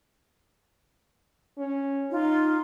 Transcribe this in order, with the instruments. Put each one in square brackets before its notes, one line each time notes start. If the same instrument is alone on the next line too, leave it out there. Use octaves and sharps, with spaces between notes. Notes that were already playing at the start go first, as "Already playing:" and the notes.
[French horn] C#4
[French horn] D#4 [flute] F4